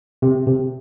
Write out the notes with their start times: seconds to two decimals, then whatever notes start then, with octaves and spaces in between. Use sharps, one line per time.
0.22 C3
0.47 C3